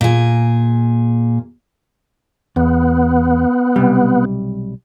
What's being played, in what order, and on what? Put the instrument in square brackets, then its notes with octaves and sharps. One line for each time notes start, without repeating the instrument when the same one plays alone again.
[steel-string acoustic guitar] A#2 G#4
[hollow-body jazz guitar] E2 [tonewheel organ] B3
[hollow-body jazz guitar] B1 C3 G3